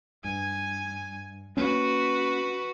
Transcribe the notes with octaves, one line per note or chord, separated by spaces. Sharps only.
G2 G#5
A#3 C#4 F#4 B4